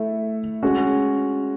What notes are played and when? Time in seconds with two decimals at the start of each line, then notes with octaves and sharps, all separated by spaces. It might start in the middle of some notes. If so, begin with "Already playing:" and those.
Already playing: A3 E4 A4
0.63 G#3 C#4 F#4